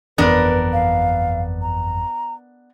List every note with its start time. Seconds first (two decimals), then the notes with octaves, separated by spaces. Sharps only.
0.18 G1 F2 E3 B3 D4 A#4 B4
0.73 F5
1.62 A#5